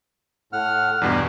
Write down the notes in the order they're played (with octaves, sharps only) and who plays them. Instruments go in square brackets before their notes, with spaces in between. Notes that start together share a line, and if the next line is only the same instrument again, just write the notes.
[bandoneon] A2 F#5 F6
[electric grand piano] E2 G2 B2 [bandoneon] D5